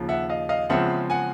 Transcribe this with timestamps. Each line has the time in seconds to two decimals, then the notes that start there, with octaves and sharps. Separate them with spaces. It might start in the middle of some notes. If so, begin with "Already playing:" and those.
Already playing: D#2 C#3 F3
0.09 E5 F#5
0.29 D#5 F5
0.49 D#5 F5
0.70 E2 C#3 F3 G#3 C4 E5 F#5
1.10 F#5 G#5